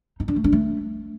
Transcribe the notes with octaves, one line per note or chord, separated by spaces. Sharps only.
D#4
D4
A3
D4
A3